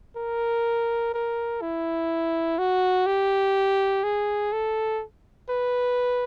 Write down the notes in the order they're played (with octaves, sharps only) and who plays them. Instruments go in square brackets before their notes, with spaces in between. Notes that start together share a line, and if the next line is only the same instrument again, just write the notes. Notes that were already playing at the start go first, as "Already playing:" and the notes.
[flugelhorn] A#4
A#4
E4
F#4
G4
G#4
A4
B4